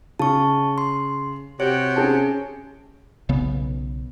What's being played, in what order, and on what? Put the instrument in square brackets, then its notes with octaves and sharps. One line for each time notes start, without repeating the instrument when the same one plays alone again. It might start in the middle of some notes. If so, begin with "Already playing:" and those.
[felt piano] C#3 [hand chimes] A5 C#6
[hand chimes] C6
[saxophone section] C3 F#4 G4 [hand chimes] C#5
[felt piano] C#4 G#4 A5
[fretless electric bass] B1 C#3 B3